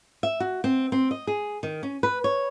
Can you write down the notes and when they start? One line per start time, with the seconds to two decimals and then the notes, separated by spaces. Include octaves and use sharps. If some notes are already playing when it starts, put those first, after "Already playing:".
0.23 E5
0.40 F#4
0.64 C4
0.92 C4
1.11 D#5
1.27 G#4
1.63 D#3
1.83 C#4
2.03 B4
2.24 C#5